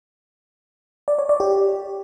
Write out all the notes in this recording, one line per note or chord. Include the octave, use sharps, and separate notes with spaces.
D5
C#5
D5
G4